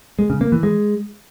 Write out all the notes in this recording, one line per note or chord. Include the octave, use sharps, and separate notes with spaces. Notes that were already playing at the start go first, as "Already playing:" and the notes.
G#3
C#3
A#3
E3
G#3